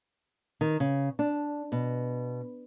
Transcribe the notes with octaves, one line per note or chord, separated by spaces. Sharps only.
D#3
C#3
D4
B2